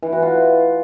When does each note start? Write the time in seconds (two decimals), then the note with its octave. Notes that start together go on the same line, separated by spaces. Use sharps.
0.02 E3
0.12 F#4
0.22 F4